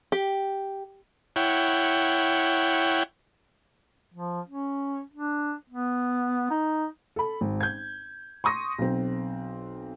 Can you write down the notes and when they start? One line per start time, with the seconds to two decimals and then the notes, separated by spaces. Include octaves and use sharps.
0.12 G4
1.36 E4 C#5 F#5 G5
4.14 F3
4.47 C#4
5.13 D4
5.69 B3
6.50 D#4
7.16 A4 B5
7.41 G#1
7.61 G6 G#6
8.44 C6 C#6 D#6 A#6
8.79 B1 C4